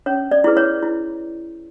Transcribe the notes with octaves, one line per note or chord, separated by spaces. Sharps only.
C#4 C#5
D5
E4 G#4 B4
C#5
E4